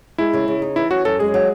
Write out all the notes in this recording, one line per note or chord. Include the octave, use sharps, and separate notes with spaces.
G#3 E4
C#3
C#3
D#4
E3 E4
C#4 F#4
F#2 A4
G#3 G#4
F#3